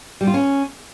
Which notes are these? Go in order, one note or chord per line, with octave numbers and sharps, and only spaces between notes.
G3
F4
C#4